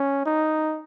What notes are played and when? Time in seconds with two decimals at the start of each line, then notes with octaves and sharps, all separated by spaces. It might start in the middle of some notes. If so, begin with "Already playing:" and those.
Already playing: C#4
0.25 D#4